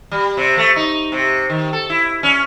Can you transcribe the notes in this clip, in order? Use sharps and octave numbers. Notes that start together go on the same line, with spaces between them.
G3
C3
A3
D#4
C3
D#3
A4
E4
C#4